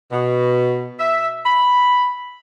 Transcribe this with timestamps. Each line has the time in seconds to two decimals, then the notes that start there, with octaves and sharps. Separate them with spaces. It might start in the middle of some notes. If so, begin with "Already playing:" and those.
0.11 B2
1.00 E5
1.45 B5